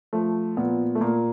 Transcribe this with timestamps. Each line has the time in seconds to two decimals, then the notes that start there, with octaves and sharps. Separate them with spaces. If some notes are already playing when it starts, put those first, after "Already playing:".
0.13 F3 A3
0.57 A#2 B3
0.95 A3
1.01 A#2 A#3